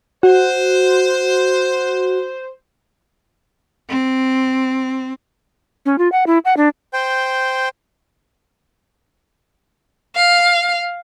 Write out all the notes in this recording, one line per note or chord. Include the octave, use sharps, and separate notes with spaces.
F#4 C5
C4
C#4
F4
F#5
E4
F#5
D4
C5 G5
F5